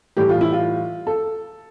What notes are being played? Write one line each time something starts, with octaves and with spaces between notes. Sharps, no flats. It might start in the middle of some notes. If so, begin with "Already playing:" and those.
A2 E3 G3 G4
F4
E4
F4
A4